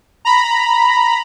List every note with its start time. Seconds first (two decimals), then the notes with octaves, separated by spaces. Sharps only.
0.25 A#5 B5